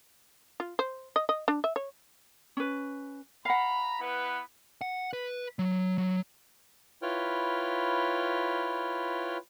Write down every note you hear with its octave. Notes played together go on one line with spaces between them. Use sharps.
F4
C5
D#5
D#5
D4
E5
C#5
C#4 B4
F5 F#5 A#5 B5
B3 E4 B4
F#5
B4
F#3
F#3
E4 F4 B4 C#5 G5 F6